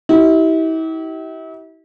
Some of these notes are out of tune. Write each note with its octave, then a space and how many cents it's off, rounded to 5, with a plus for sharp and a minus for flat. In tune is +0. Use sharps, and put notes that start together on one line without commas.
E4 -40 G4 -35